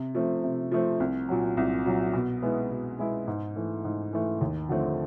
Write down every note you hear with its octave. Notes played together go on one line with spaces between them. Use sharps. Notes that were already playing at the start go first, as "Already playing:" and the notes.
Already playing: C3
F3 A3 C4
C3
F3 A3 C4
C2
A#2 F#3
C2
A#2 F#3
B2
G#3 B3 E4
B2
G#3 B3 E4
G#2
E3 A3
G#2
E3 A3
D#2
D3 F3 A3 C4